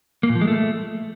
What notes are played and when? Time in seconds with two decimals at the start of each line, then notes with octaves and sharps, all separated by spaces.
0.23 A#3
0.29 A#2
0.35 F3
0.41 G#3
0.47 A3